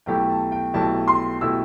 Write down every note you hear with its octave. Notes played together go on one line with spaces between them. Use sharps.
B1 B2 A3 E4 G4 G5
A5
G5
B1 B2 A3 E4 G4 A5
C6
B2 A3 E4 G4 E6